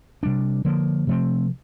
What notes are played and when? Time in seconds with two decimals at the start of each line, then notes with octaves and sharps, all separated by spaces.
0.23 C3 G3 D4
0.65 D3 F3 A#3
1.07 C3 F3 A3 C4